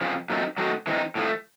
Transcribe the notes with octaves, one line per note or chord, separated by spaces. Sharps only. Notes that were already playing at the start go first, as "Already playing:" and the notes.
F2 C#3 F3
A#2 F#3 A3 C4 D#4
F#3 A3 C4 D#4 F#4
E3 G#3 C4 D#4
A2 F3 A3